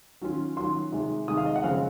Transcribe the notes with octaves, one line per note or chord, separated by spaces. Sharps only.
D#3 F#3 C#4 F4
D#3 F#3 C#4 F4 C6
C3 D#3 G#3
C3 D#3 G#3 D#6
F5
D#5
F#5
F#2 C#3 F3 G#3 C4 F5